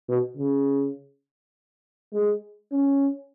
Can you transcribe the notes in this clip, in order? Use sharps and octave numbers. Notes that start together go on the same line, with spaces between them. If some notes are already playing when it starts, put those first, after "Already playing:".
B2
C#3
G#3
C#4